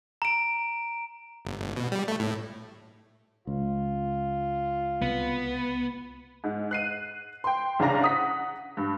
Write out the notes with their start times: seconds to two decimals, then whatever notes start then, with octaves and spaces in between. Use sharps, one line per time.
0.22 A#5 D7
1.45 G1
1.59 G1
1.76 B2
1.92 G3
2.08 A3
2.20 A2
3.47 C#2 F4
5.02 C2 B3
6.44 G#2
6.71 F#6 C7 D#7
7.44 G5 C6
7.79 C2 C#3 D4 F5 A#5 A#6
8.02 F#5 D#6 B6
8.77 G2